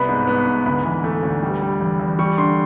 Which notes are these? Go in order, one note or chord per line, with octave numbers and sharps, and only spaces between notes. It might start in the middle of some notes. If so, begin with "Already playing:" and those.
Already playing: C2 B3 B5
G#2
B3
G#2
D2 B5
E3
A3
D2
G3
G3
E2
E2
G3 C#6
D3 C6